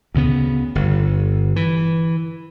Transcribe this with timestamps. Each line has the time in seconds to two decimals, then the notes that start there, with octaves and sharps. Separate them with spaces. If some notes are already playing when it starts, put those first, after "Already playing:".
0.15 D2 C#3 B3
0.75 G1
1.56 E3